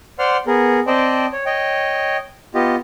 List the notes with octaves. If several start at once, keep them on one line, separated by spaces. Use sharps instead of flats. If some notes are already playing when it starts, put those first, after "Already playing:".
C5 D5 F#5 C6 F6
B3 G#4 A#4
C4 C5 D5 D#5 G5 A5
C#5
C#5 D#5 G5
B3 F4 G4 D#5